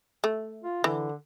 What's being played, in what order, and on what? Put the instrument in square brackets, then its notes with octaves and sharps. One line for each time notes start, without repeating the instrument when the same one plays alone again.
[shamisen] A3
[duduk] F4
[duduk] D3 [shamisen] E3